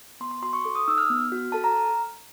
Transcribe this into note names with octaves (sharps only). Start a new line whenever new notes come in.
B3 C6
C6
F#4 C6
C#6
A4 D6
D#6
D#4 E6
F6
B3
F#4
A4 A5
A#5